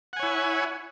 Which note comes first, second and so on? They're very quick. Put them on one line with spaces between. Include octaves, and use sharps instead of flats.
F#5 G#5 C#5 E4